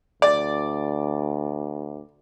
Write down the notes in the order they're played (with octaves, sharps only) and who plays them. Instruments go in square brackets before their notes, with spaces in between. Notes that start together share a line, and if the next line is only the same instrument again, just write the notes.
[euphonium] D2 [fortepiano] D5